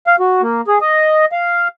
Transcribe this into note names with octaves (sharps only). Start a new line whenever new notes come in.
F5
F#4
A#3
G#4
D#5
F5